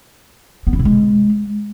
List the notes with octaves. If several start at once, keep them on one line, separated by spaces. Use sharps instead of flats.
B3
E4
C3
G#3